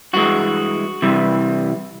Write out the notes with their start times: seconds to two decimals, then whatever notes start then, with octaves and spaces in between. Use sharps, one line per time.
0.13 G2 E3 G#3 F#4
1.02 C3 E3 G3